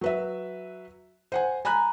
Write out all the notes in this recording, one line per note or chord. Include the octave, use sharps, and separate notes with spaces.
F#3 B4 E5
C5 F#5 G#5
G#5 A#5 B5 F#6